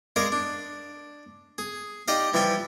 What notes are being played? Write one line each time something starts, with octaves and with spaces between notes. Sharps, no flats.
G#3 G#4 A#4 D5 F5
D4
G#4
D#4 G4 D5 D#5 F5
E3 F3 G3 G5 G#5